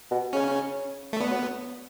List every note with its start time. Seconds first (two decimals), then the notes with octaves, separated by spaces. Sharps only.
0.11 B2
0.33 C#3 C#4
1.13 A3
1.19 D3 B3
1.30 F#3